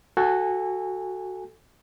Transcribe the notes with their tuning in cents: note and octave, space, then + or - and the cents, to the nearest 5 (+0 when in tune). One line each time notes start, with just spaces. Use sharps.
F#4 +5 A4 +0 G#5 -25